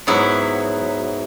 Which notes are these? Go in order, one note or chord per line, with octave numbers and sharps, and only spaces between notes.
G#2 F#3 B3 E4